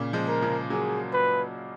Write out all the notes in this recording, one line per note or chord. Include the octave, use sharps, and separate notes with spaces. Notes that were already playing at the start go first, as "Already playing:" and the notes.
Already playing: A#2 C#3
F3 G#3
A#4
C#3 F3
F#3 A#3 G#4
B4